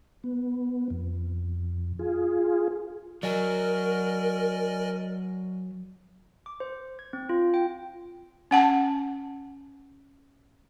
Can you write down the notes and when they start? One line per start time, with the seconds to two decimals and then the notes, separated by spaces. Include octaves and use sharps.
0.24 B3
0.90 F2
1.99 F4 G#4
3.23 F#3 A#4 D5 D#5 G#5
6.46 D6
6.60 C5
6.99 G#6
7.13 C4
7.29 F4
7.54 G5
8.51 C#4 F#5 A5